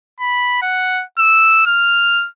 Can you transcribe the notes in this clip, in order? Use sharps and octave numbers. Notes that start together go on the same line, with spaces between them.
B5
F#5
E6
F6